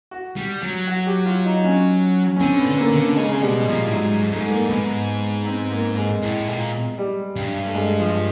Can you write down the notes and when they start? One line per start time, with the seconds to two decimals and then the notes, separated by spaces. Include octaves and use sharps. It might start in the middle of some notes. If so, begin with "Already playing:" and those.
0.11 F#4
0.36 G3
0.62 F#3
0.87 F#4
1.06 G4
1.26 F4
1.45 D#4
1.64 C#4
2.36 C#4
2.40 D3 C4
2.59 B3
2.66 D3
2.78 A#3
2.91 D3
2.97 A#3
3.16 C#3 G#3
3.32 G#3
3.42 B2 G3
3.67 A#2 F3
3.86 A2
3.93 G#2 F#3
4.31 G#2 A3
4.50 A#3
4.69 G#2 B3
5.46 C4
5.71 A#3
5.97 G#3
6.22 A2
6.48 A#2
6.98 G3
7.36 G2
7.65 A3
7.75 G#3
8.00 F3